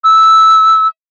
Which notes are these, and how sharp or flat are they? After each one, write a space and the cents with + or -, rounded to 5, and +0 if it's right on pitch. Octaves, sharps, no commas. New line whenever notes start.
E6 -5